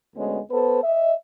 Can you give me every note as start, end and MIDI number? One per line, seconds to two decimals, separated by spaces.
0.16 0.39 38
0.16 0.39 56
0.16 0.39 59
0.16 0.39 61
0.51 0.81 59
0.51 0.81 69
0.51 0.81 71
0.51 0.81 72
0.84 1.14 75
0.84 1.14 76